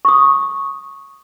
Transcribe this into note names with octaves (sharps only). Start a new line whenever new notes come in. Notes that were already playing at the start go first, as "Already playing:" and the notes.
C#6 D#6